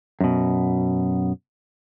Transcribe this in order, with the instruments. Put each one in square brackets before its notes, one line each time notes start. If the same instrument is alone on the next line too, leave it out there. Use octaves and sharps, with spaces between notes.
[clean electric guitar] F#2 B2